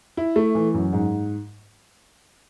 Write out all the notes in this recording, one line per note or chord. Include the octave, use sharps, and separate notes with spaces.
E4
A3
E3
F#2
G#2